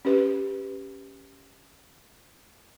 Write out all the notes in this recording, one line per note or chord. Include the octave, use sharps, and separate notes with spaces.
C#4 G4 B4